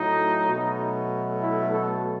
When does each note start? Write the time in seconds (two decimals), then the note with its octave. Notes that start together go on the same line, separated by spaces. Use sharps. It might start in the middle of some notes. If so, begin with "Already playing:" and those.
Already playing: A2 F#3 A3 D#4
0.46 B2 F#3 A3
1.41 E4
1.72 A4